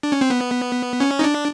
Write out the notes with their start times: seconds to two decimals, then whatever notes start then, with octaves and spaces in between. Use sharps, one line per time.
0.03 D4
0.12 C#4
0.21 C4
0.30 B3
1.00 C#4
1.19 D#4
1.24 D4